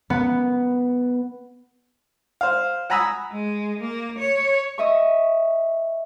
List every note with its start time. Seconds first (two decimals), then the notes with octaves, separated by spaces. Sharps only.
0.10 B3
2.41 C5 F5
2.90 F#5 G#5 A#5 B5 D#6 E6
3.32 G#3
3.80 A#3
4.19 C#5
4.78 D#5 E5 C#6